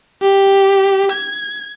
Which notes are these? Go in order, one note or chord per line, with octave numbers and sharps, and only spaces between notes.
G4
G#6